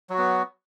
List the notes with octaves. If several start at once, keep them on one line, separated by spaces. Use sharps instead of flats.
F#3 B3 F#4